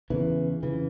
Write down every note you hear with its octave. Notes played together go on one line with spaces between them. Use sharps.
E2 C#3 E3
F2 C#3 E3